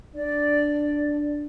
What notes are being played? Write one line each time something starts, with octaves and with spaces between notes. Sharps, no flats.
D4 D5